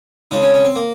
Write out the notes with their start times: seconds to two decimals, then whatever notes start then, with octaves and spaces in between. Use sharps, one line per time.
0.31 F2 C#3 G#3 D#4
0.43 C#4
0.54 C#4
0.65 C4
0.75 A#3